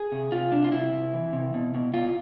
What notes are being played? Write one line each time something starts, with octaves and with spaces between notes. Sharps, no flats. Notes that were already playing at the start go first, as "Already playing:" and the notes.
Already playing: G#4
C3
C3 F4
C3 D4
F4
C3 E4
C3
E3
C3
B2
B2
B2 F4